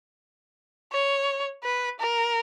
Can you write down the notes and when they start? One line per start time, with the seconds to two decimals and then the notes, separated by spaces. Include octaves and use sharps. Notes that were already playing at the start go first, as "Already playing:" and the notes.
0.92 C#5
1.64 B4
2.00 A#4